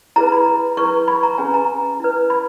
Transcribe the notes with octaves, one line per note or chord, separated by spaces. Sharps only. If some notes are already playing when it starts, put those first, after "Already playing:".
E4 G#4 B4 A#5
B5
E4 G#4 B4 C#6
B5
A#5
C#4 G#4 B4 G#5
A#5
E4 B4
B5